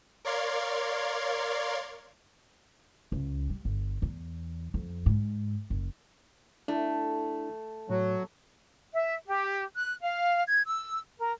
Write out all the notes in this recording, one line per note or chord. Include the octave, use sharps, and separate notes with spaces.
A#4 C#5 D5 F5 C6 G#6
C#2
G3
G1
E2
F2
G#2
F#1
A3 D4 E4
A2 F#3
E5
G4
F#6
F5
G#6
E6
A#4